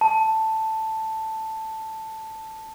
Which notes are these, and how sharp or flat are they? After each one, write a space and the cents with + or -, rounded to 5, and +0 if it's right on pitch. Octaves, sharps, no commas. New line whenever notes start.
A5 +5